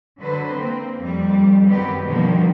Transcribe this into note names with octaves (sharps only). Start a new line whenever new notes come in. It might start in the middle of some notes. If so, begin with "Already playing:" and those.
D3 F#3 B4 C5
A#3 C4
F2 G3
F#2 D#3 B3 C4 G4 B4
B2 D3 D#3 F3 G3 A#3